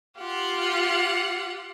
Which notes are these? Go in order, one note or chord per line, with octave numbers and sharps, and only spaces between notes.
F4 G4 F#5